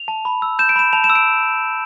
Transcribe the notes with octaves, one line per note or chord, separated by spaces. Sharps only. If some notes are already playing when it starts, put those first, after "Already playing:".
Already playing: F7
A5
B5
E6
G6 E7
D7
B5 E7
A5 F7
E7
E6
D7